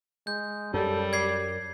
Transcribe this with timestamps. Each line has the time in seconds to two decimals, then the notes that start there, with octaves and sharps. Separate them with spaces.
0.27 G#3 G6
0.74 F#2 G3 A4
1.13 D5 G#6 C7